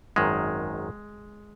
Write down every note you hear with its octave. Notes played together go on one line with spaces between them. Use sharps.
G#1 F#2 D#3 G#3